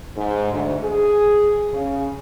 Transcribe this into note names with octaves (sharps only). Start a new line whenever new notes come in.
G#2
D2
G#4
C#3